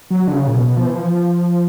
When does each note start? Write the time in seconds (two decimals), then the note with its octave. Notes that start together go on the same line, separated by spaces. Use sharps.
0.11 F#3
0.28 D3
0.33 C#3
0.47 A#2
0.54 B2
0.77 F3
0.86 E3
0.95 F3